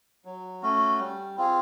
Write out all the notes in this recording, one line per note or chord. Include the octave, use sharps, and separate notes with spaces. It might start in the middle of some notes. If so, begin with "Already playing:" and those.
F#3
A3 C#4 F#4
G3
C4 F4 G#4